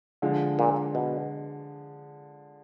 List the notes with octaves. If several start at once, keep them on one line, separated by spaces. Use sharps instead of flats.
D3 F3 G#3
A#2
B2